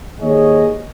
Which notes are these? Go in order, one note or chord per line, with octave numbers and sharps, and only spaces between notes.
D#2 G#2 A#3 G#4 C#5 D#5